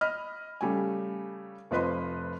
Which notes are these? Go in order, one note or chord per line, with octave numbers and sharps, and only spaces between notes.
D#5 B5 F6
C#3 G3 A3 G#5
F1 F3 B4 D#5 C6